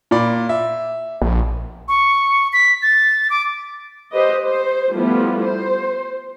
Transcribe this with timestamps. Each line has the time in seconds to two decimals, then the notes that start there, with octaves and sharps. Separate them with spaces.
0.11 A#2 D5 B5
0.49 E5
1.22 A#1
1.88 C#6
2.53 B6
2.82 A6
3.30 D6
4.13 G4 B4 C5 D#5
4.44 C5
4.92 F3 G3 A3 B3 E4 F4
5.44 C5